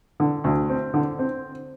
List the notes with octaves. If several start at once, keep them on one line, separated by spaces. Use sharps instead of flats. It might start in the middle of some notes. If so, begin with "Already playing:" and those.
D3
D2
C4
D3
C4